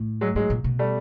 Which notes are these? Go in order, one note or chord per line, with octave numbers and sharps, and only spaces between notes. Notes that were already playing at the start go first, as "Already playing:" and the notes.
Already playing: A2
F#3 G#3
G#2 F#3 G#3
A#2
B2
G3 A3